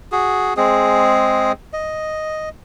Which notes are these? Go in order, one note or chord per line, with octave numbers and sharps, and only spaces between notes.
F#4 G#4
G#3 C4 G#4
D#5